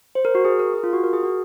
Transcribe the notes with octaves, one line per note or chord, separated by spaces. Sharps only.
C5
A#4
F#4
G#4
A#4
G#4
F4
F#4
A#4
G#4
F#4